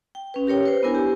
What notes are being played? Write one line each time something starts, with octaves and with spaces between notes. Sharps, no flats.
G5
C#4 B4
G4 A#4 C#5 G5
B4 C5
B3 D4 E4 A#4 G#5
G4